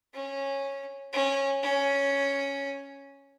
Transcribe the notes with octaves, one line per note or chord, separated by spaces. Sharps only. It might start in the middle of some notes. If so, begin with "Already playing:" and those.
C#4
C#4
C#4